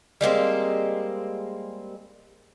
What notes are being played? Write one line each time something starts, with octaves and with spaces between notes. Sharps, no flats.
G3 G#3 A#3 C4